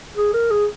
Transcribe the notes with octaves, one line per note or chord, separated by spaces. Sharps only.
G#4
A#4
G#4